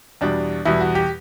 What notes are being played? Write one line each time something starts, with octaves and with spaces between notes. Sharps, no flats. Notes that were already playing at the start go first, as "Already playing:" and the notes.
E2 B2 G3 D4
E2 B2 G3 E4
F#4
G4